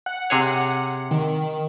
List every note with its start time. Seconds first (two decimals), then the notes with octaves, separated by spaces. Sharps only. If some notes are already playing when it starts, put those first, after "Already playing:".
0.06 F#5
0.30 C3 G#4 C#5
1.11 D#3